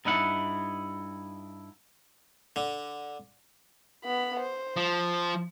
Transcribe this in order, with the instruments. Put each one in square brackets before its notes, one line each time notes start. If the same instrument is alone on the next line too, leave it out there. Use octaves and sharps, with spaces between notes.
[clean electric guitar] G2 D#4 E4 F#5
[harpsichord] D3
[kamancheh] B3 B5
C5
[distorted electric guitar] F3